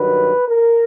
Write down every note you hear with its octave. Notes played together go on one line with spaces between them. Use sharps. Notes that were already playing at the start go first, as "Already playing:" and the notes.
Already playing: G2 D#3 F#3 B4
A#4